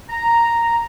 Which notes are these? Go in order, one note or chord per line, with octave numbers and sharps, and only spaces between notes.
A#5